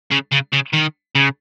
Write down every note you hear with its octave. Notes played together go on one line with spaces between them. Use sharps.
C#3
C#3
C#3
D#3
C#3